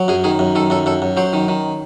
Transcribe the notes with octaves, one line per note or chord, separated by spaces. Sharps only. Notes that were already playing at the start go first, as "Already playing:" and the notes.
Already playing: F#3
F#2 G#4
D#3 G#4
F#2
D#3 A4
F#2 A4
F#2 A4
F#2
F#3 C5
D#3
D#3